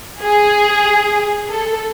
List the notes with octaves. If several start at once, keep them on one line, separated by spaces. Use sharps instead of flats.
G#4
A4